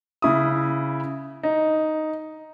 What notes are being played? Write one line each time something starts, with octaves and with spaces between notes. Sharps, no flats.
C#3 E4 D#6
D#4